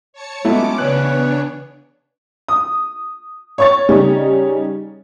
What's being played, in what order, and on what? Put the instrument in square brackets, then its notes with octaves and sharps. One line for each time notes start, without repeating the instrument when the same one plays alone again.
[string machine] C#5 A5 C#7
[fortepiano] F#3 A3 E4 [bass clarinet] G#3 [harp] B3 [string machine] C#4 D6
[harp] C#3 F#6 [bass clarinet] E3 [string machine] B3 D4 C#5
[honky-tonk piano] D#6
C#5 C#6 A6
C#3 G3 C#4 D#4